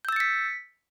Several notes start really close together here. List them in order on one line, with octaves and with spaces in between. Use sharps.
G6 E6 A6 C#7 B6